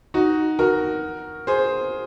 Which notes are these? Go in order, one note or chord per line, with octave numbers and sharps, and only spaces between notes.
D#4 F#4
F#4 A#4
G#4 C5